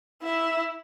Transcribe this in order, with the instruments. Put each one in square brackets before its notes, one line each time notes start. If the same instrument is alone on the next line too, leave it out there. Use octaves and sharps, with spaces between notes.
[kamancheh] E4 E5